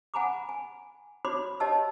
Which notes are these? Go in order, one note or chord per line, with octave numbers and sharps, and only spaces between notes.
F#5 G#5 A#5 B5 D6
G#5
F#4 C#5 D5 B5 C6 D6
G4 C#5 D#5 A5 E6